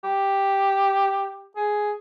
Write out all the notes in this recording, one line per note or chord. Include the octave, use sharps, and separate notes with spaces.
G4
G#4